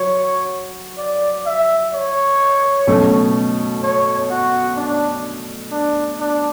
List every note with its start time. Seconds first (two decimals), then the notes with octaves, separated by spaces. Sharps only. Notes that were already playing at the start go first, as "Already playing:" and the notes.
Already playing: F#3 C#5
0.98 D5
1.46 E5
1.93 C#5
2.87 B2 F#3 A3 C#4
3.83 C#5
4.30 F#4
4.76 D4
5.71 D4
6.19 D4